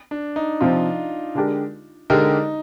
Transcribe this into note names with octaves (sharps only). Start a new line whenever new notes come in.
D4
D#4
C3 F3 C4 F4
D3 G#3 D4 G4 A#4
D3 G#3 D4 D#4 G4 A#4